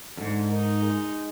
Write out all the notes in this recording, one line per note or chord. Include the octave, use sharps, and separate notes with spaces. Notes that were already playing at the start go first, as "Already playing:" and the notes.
F2 G#2 D3
D#4 A#4
G#3